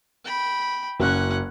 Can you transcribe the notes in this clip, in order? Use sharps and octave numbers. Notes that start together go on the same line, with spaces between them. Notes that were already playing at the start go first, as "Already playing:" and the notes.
G5 B5
F#1 C#4 F#5 F#6